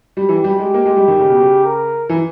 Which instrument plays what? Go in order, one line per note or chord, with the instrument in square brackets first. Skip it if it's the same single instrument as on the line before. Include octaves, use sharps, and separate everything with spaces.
[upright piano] G3
[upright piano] E3 [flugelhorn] G4
[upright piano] G3
G#3
A#3
G#3
G3
D#3
C#3
B2
C#3
[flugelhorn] A#4
[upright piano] E3